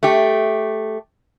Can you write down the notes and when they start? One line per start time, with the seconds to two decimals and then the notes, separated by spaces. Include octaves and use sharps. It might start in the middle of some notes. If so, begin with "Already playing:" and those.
0.03 A3 G4